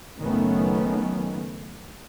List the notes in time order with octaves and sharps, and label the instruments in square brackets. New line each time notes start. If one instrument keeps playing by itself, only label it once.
[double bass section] F#1 D#3 F#3 A3 B3 C#4